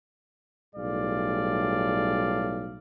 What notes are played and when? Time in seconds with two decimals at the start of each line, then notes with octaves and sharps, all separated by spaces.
0.76 B1 A2 G3 G#4 D5 F5